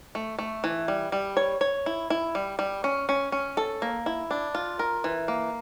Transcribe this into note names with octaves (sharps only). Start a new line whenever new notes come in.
A3
A3
E3
G3
G3
C#5
C#5
E4
E4
G3
G3
C#4
C#4
C#4
A4
A#3
E4
D4
F4
A#4
E3
A#3